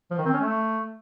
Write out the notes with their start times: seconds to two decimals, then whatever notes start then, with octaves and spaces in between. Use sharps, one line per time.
0.11 F3
0.18 D#3
0.25 C4
0.33 C#4
0.40 A3